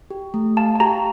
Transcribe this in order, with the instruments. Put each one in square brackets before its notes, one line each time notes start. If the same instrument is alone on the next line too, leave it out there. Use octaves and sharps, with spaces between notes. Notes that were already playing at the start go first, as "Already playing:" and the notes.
[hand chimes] G4
A3
[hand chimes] F5 [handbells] A5
[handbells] A5
[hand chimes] G4 [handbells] A#5